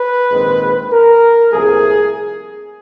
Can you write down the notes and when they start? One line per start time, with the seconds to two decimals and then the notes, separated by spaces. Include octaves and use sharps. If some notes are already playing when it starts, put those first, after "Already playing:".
Already playing: B4
0.32 A#1 G#2 D#3 G#3 C4
0.92 A#4
1.52 C2 A#2 F3 A3 G#4